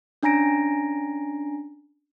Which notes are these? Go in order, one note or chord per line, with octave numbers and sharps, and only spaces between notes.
C#4 D4 G#5 A#5 A#6 D7